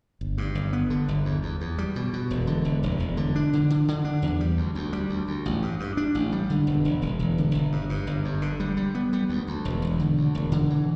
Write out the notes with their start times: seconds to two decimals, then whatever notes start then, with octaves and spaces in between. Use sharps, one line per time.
0.21 G1
0.38 G2
0.55 G1
0.73 B3
0.90 D3
1.08 G1
1.25 E2
1.43 E2
1.61 E2
1.78 G3
1.96 B2
2.13 B2
2.30 E1
2.47 D3
2.65 E1
2.83 E1
3.00 E1
3.17 D3
3.36 D4
3.53 D3
3.70 D3
3.88 D3
4.05 D4
4.22 E2
4.40 G3
4.57 D2
4.75 D2
4.93 G3
5.10 D2
5.27 D2
5.46 A1
5.62 G2
5.80 G2
5.97 D4
6.15 A1
6.32 G3
6.50 D3
6.67 E1
6.85 E1
7.02 E1
7.19 E1
7.38 D3
7.55 G1
7.72 G2
7.90 G2
8.07 G1
8.25 G2
8.42 D3
8.60 G3
8.77 G3
8.95 B3
9.13 G3
9.29 D2
9.47 D2
9.65 E1
9.82 E1
9.99 D3
10.18 D2
10.35 E1
10.52 D3
10.70 E3